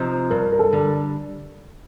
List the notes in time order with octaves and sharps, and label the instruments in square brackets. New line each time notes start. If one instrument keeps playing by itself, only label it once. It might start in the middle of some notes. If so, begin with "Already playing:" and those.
Already playing: [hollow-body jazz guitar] C3 F3 C4 D#4
[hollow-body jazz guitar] G2 [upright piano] A#4
[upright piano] A#4
A4
[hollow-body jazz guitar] D3 G3